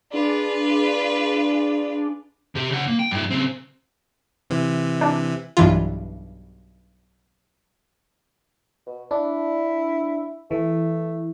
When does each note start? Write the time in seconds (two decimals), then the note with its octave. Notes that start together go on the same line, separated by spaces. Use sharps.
0.11 D4 F4 G#4 B4 D5
2.55 C3 G4
2.71 C#3 F#5
2.87 A#3
2.99 G5
3.11 G2 E4
3.31 C#3 C4
4.50 C3 E3
5.01 D4
5.57 B1 G2 E3 F4
8.87 B2
9.11 D4 E4
10.51 E3 A3